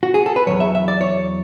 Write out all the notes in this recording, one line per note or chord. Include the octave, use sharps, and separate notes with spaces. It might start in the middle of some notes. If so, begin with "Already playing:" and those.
F#4
G#4
A4
B4
E2 B2 F#3 C#5
E5
E5
D5
C#5